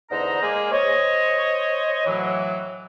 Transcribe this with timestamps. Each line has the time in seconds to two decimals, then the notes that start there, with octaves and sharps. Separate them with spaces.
0.10 E2 D3 D#4 C5 A#5
0.42 G#3 A#3 G#4
0.72 C5 C#5 D#5
2.06 A2 E3 F#3